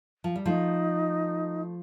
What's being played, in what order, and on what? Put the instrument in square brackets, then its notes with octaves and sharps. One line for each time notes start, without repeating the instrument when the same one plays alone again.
[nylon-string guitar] F3
G3
[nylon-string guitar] F3 A3 [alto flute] D#4